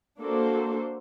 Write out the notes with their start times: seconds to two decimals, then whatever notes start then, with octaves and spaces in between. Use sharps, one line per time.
0.20 A#3 D4 F#4 A4 C5